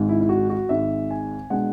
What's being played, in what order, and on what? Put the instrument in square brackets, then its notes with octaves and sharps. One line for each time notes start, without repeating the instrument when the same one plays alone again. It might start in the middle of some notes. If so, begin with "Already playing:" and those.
Already playing: [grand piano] G#1 G#2 G#3
E4
E4
F#4
F#4
G#1 G#2 G#3 E5
G#5
B2 G#3 D4 F#5